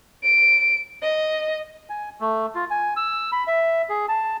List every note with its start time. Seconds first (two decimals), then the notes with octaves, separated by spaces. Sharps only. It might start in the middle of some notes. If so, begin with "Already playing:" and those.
0.23 D7
1.02 D#5
1.89 G#5
2.20 A3
2.55 F4
2.70 G#5
2.97 E6
3.32 B5
3.47 E5
3.89 G#4
4.09 A5